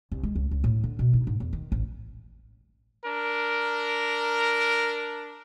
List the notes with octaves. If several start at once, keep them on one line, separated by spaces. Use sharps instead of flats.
C2
G#3
C#2
C#2
A2
D3
B2
D#4
G#2
E2
D#3
A1
D4 A#4